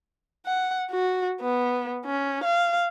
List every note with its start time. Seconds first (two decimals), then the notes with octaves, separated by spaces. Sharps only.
0.46 F#5
0.91 F#4
1.41 B3
2.06 C#4
2.44 F5